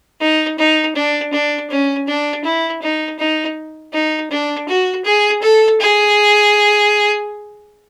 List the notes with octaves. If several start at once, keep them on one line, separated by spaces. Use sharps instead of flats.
D#4
D#4
D4
D4
C#4
D4
E4
D#4
D#4
D#4
D4
F#4
G#4
A4
G#4